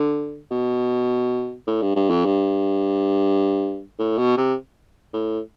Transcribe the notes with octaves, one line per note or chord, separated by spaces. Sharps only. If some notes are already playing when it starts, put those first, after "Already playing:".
Already playing: D3
B2
A2
G2
G2
F2
G2
A2
B2
C3
A2